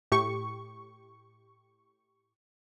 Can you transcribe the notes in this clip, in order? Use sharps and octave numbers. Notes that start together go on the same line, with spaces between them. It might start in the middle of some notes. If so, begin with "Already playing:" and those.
A2 G4 C#6